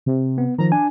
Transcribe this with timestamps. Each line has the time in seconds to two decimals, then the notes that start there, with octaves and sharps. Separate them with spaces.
0.06 C3
0.38 B3
0.59 D#3 F3 A#5
0.72 D4 G#5